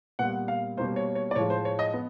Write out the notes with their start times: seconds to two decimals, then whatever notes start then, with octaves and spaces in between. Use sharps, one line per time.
0.19 A#2 G3 B3 F#5
0.48 F5
0.77 B2 G3 A#3 C5
0.96 C#5
1.15 C#5
1.31 D5
1.36 A2 F3 G#3 C#5
1.50 C5
1.65 C#5
1.79 D#5
1.93 B3